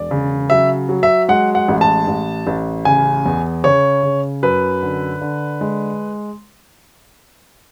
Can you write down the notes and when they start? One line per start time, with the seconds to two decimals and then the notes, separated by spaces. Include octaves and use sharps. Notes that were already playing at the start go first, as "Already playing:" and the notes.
Already playing: E1 D5
0.11 C#3
0.50 F#3 E5
0.89 F#3
1.03 E5
1.28 G#3 F#5
1.55 F#5
1.68 A1
1.81 A5
2.07 A1
2.47 A1
2.85 C#3 G#5
3.26 E2
3.64 C#3 C#5
4.03 C#3
4.43 F#2 B4
4.83 D3
5.21 D3
5.61 G#3